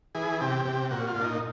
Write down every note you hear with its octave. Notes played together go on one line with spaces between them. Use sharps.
E3 G#4
C3 G4
C3
A#2 F#4
F4
A#2 D4
D#4